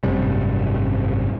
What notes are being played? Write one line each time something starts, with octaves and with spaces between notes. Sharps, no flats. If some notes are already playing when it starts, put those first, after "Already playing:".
G#1 F#2 C3 G3